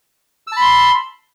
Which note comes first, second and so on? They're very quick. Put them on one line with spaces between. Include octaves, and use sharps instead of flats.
E6 A5 B5 C6